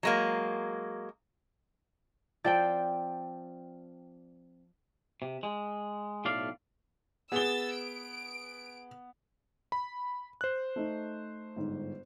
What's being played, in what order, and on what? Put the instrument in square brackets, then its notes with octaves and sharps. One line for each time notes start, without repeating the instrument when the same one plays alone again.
[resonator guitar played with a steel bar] F#3 G#3 A#3
[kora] F3 C4 [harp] D5 G5
[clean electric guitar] C3
G#3
B1 A2 D5 F5
[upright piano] B3 G7 [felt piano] G#4 [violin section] E6 A6
[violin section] D7
[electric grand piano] B5
C5 F#6
[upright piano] A3 D#4
G1 G#2